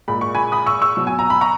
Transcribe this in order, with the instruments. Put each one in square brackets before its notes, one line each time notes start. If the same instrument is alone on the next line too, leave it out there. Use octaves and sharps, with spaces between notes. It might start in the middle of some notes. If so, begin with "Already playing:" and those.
[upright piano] A#2 G#3 B5
C#6
G#5 B5
B5 D#6
C#6 E6
C#6 E6
B2 F#3
G#5
A#5
B5
A#5 C#6